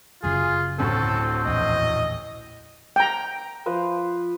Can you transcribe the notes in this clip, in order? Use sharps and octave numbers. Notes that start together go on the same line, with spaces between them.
F#1 F#2 C#3 F4 G#4
A1 D2 A2 C4 A4
A#1 E2 D#5
G5 A#5
F3 B4 C5